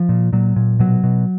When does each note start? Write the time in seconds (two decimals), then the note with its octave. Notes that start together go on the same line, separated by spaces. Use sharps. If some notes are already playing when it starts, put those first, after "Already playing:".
Already playing: F3
0.09 A#2
0.33 A#2 F#3
0.56 A#2
0.79 B2 F#3
1.04 B2